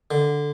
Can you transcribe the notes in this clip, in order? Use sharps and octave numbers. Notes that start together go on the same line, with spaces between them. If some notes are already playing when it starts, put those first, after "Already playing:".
D3